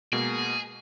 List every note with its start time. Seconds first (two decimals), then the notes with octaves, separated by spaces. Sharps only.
0.13 B2 G#3 A#3 G#4